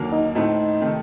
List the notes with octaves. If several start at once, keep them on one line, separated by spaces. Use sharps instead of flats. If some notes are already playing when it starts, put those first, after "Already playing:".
Already playing: D#2 D3 F#3 A#3
D#4
A2 A3 C4 D#4
C3 D#3 A3